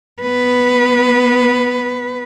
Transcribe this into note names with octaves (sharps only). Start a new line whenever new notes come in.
B3 B4